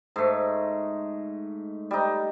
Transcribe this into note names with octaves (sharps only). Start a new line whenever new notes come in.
G#2 A3
G3 D#4